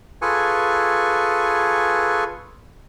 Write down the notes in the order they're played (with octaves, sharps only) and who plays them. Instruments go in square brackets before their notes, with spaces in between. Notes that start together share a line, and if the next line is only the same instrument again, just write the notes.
[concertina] F4 G#4 A4 B4 G#5 C#6